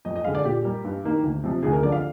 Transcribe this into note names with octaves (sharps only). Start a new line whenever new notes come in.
F2 D#5
D#5
D3 G#3 F5
D5
A#2 G4
G3 A#3
G2
D#3 A#3
D2
C3 F3
D2 G#4
A#4
D3 F3 D5
F5